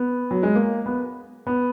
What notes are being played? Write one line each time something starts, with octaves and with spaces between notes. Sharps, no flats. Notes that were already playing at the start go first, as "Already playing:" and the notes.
Already playing: B3
F#3
G#3
A#3
B3
B3